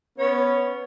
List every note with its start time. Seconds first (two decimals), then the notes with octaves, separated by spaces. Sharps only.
0.19 B3 C#4 C#5